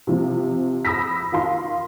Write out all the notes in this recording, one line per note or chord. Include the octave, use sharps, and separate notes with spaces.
C3 F3
B5 D#6 E6 A#6 B6
D#3 F4 F5 C6